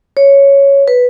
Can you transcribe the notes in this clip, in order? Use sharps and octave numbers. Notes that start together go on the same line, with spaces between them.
C#5
B4